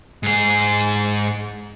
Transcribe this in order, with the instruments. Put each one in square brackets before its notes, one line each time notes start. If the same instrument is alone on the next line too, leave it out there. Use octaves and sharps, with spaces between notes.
[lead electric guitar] G#2 G#4